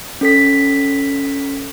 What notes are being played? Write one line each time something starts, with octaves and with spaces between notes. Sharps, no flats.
C#4 A4 B6